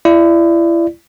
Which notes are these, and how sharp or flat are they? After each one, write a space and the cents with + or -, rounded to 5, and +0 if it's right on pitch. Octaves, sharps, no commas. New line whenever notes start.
E4 +30 D5 +10